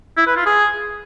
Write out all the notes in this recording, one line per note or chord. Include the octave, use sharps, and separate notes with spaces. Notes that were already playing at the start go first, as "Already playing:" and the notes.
E4
B4
F4
G#4